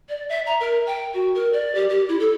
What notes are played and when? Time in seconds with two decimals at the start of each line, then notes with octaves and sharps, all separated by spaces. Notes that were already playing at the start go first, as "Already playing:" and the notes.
0.09 D5
0.29 E5
0.47 A#5
0.60 A#4
0.87 G5
1.14 F#4
1.35 A#4
1.53 D5
1.75 G4
1.89 G4
2.09 E4
2.20 A4